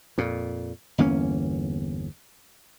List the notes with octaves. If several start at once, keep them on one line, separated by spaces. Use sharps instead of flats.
F2 A#2
G1 E2 A#3 C#4